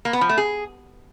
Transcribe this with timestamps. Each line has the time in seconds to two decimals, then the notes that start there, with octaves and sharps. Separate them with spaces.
0.05 A#3
0.13 B3
0.21 F3
0.29 A3
0.38 G#4